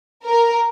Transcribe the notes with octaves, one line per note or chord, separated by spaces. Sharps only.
A#4